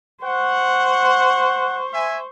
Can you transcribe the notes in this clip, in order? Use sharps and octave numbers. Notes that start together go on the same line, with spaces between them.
C5 F#5 C#6
E5 G#5